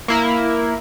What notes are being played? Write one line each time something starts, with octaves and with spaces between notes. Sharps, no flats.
A#3 E4 A#4